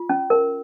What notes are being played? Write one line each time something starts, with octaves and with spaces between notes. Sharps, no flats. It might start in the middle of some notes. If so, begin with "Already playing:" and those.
Already playing: F4
C#4
A#4